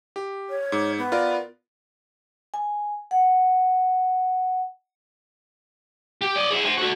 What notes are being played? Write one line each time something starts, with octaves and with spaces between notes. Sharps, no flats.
G4
C#5
G#2
B3
F4 A#4 D5
G#5
F#5
G4
D5 D#5
E4 G#4
C5 G#5
F#4 A4